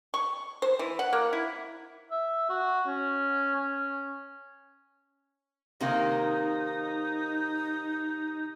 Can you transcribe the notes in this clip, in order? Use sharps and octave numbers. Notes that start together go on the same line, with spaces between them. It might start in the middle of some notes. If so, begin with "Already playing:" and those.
C#6
C5
E3
F#5
A#3
E4
E5
F#4
C#4
C#4
C3 D#3 A#3 D#4